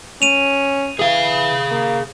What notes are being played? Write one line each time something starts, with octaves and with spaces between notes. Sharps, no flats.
C#4 D#7 F7
E3 G#4 F5
A#3